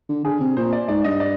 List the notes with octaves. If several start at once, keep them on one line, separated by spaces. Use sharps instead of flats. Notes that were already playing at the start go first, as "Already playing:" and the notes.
D3
D3 G#4
C3
A#2 C5
D5
G#2 D5
G2 D#5
D5